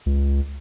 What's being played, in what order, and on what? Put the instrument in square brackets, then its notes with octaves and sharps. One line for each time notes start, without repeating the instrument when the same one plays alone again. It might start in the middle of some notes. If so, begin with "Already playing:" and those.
[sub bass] C#2